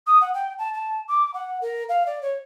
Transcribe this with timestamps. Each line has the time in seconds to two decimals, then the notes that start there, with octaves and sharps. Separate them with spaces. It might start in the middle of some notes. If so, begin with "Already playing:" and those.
0.06 D#6
0.21 F#5
0.34 G5
0.58 A5
0.73 A5
1.08 D6
1.33 F#5
1.61 A#4
1.89 F5
2.06 D5
2.21 C#5